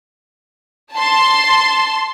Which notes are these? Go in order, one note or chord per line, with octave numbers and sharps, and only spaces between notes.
A5 C6